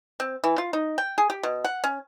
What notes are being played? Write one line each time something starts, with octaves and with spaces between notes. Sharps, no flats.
C4
E3
F4
D#4
G5
G#4
G4
B2
F#5
C#4